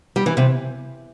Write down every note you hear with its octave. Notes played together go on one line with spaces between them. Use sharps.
G3
E3
C3